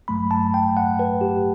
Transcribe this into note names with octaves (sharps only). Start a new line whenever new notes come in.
A1 G2 F#3 A3 B5
A5
G5
F#5
B4
G4